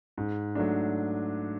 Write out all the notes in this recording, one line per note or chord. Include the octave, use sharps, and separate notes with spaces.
G#2
F#3 A3 D4